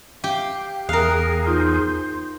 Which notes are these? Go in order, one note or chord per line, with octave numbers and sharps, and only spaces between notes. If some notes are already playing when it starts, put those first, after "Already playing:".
G4 F5
E2 G#4 A#4 F5 A#5 D#6 F#6
D#4 F4 C5 C6 G6